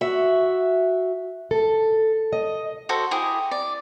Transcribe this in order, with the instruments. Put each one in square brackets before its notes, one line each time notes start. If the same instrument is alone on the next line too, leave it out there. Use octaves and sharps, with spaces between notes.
[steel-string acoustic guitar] F#4 E5
A4
D#5
[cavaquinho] F#4 A4 C5
E4 G4 G#4
D5